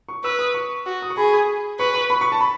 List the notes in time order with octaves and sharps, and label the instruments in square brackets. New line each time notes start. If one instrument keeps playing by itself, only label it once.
[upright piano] C#6
[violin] B4 [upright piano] E6
[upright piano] D#6
C#6
[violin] F#4
[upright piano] D#6
C#6
[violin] G#4 [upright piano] B5
[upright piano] B5
[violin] B4 [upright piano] C#6
[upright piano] C#6
B5
C#6
A5
B5